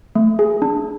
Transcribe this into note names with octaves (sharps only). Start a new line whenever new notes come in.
A3
G#4
D4